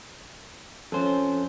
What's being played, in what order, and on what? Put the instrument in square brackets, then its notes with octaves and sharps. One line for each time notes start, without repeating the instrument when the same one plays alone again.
[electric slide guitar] F2 C5 [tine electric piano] F3 C#4 A4